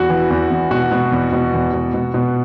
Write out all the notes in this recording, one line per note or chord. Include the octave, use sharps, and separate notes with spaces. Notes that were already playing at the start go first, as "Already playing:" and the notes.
Already playing: E2 F#4
E3
E2
E2
B2 F#4
B2
E2
B2
E2
B2
B2
B2